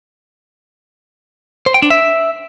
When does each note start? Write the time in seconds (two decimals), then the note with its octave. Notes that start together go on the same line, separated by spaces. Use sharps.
1.66 C5
1.74 G5
1.82 D4
1.90 E5